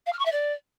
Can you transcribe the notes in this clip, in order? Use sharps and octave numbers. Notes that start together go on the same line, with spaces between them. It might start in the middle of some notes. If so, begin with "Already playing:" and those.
F5
F6
C#6
E5
D5